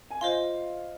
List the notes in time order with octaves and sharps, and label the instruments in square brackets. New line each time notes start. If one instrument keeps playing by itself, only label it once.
[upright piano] G#5
[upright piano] F4 F5 [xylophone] C5 D#5 C6